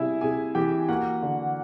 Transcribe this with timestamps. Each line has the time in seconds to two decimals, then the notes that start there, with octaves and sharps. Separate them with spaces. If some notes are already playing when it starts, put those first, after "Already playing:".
Already playing: C3 G3 E4 G#4 E5 G#5
0.21 C3 G#4 G#5
0.55 E3 G4 G5
0.89 A#3 F#4 F#5
1.23 D3